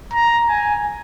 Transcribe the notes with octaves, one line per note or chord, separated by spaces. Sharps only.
A#5
G#5